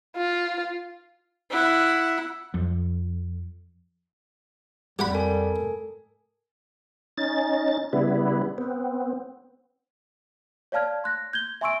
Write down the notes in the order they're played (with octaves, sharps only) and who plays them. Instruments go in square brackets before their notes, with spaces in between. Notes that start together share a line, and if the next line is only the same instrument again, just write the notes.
[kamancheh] F4
[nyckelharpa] E4 F#5
[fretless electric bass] F2
[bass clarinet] F2 [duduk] G3 [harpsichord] G4 F#5 B5
[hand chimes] A4 A#4 G#5
[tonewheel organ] C#4 D#4 A6
C#3 G3 B3 E4
B3 C4
[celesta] C#5 D5 F5 A5 F6 G#6
C6 F#6 A#6
G6 G#6 G7
E5 G#5 C6 C#6 E6 D7